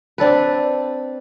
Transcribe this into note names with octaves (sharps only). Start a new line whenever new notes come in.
C4 D4 A4 B4